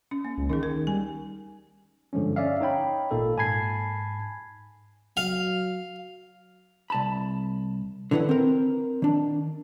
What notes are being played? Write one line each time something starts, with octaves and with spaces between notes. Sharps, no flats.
C#4
A#3
C#2
D#3 C#4 D#4 G#4
A#4
G3 G#5
G2 D3 F3 G#3 C#4
C#4 D5 E5 F5
D#4 C#5 G5 B5
G#1 A#2 A#3 A4
G#2 G#5 A5 B5 G#6 C7
F#3 F5
C2 A5 B5
D3 D#3 E4 B4 F#5
C4 A#4
D#3 D4